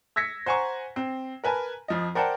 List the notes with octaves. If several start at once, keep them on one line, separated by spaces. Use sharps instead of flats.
E6 G#6 A#6 B6 C#7
C5 F#5 G#5 A#5 C#6
C4
A#4 B4 G#5 A5
F2 F3 D#5
A#4 C5 D5 F#5 G5 A5